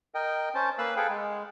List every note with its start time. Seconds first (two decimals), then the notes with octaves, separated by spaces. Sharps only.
0.14 A#4 D#5 G5
0.55 C#4 C5 A5
0.78 A#3 B4 F5 E6 F#6
0.97 G#4 A4 B4 F5 G5
1.09 G#3